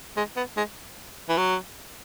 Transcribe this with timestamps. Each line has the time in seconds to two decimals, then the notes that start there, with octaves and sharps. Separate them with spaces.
0.17 G#3
0.37 B3
0.57 G#3
1.29 E3
1.37 F#3